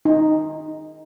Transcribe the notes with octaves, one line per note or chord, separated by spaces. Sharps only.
D#4